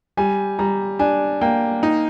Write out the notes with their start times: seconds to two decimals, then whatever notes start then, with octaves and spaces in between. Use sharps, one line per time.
0.17 G3 G#5
0.59 G3 A#5
0.99 D4 G#5
1.41 A#3 G5
1.83 D#4